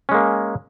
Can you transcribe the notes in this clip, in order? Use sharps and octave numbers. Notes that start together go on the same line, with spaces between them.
G#3 A#3 C#4